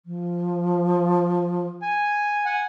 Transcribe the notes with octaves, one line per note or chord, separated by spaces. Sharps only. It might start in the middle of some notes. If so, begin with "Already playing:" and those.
F3
G#5
F#5 G#5